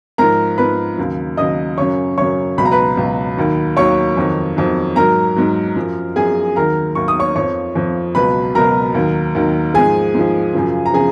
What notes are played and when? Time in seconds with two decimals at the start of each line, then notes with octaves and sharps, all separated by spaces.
0.18 G#2 F3 A#4 A#5
0.58 G#2 F3 B4 B5
0.98 D#2 C#3 F#3
1.37 D#2 C#3 F#3 D#5 D#6
1.78 F#2 C#3 F#3 C#5 C#6
2.18 F#2 C#3 F#3 C#5 C#6
2.58 C#2 B2 F#3 B5
2.65 A#5
2.72 B4 B5
2.97 C#2 B2 F#3
3.37 D#2 D#3 F#3
3.77 D#2 D#3 F#3 C#5 C#6
4.17 F2 D#3 F#3
4.57 F2 D#3 F#3
4.96 G#2 F#3 A#4 A#5
5.36 G#2 F#3
5.76 F#2 F3
6.16 F#2 F3 G#4 G#5
6.56 D#2 D#3 F#3 A#4 A#5
6.95 D#2 D#3 F#3 C#6
7.08 D#6
7.20 C#5 C#6
7.36 F2 F3 C#5 C#6
7.75 F2 F3
8.15 C#2 B2 F#3 B4 B5
8.55 C#2 B2 F#3 A#4 A#5
8.94 D#2 D#3 F#3
9.35 D#2 D#3 F#3
9.74 G#2 F3 G#4 G#5
10.15 G#2 F3
10.55 F#2 C#3 F3
10.86 A#5
10.94 C#3 F3 G#4 G#5